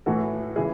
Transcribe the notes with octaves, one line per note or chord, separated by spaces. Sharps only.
A2 E3 F#4 A4
C#3 E3 E4 G#4